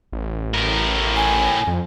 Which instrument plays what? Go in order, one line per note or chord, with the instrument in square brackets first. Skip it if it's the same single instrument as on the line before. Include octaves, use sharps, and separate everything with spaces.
[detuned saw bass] A1
[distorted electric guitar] A2 A#4
[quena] G#5
[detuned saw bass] F2